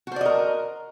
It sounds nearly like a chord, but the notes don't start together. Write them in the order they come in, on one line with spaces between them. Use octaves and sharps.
F#4 C5 D5 D#5 A#4